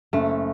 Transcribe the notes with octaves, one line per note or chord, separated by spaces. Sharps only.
F#1 A3